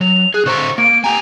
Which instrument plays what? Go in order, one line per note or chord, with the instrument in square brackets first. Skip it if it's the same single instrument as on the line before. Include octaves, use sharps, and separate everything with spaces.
[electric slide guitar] F#3 [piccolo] F7
[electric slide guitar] G#4 [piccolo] F#6
[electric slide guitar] D3 C5 A#5 [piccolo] C#6
[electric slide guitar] A#3 [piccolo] D7
[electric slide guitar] G4 G5 G#5 [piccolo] A#5